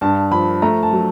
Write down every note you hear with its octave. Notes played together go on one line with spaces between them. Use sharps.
G2 A5
F3 B5
A3 A#5
A5
F#3